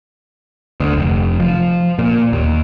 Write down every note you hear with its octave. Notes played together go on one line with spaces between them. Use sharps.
D2
F1
F3
A#2
D#2